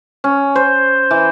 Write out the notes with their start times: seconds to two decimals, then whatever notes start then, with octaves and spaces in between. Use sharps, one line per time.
0.24 C#4
0.55 C5
1.11 E3